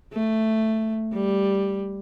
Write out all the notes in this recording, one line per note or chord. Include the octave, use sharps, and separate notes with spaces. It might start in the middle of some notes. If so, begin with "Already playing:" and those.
A3
G3